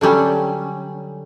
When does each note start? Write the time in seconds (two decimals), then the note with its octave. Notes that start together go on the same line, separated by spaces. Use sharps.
0.01 D3 F#3 G3 C#4